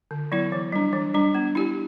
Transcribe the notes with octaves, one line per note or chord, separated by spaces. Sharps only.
D3
F#3 B3 E4
E3
G3 D4
E3
G3 D4
B3
E4 G4